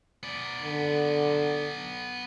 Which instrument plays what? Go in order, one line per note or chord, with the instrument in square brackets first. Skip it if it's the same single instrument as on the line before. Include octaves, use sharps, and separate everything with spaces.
[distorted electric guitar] B3 D5
[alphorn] D3